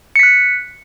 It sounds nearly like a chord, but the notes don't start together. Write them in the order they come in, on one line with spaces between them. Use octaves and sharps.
C#7 B6 F#6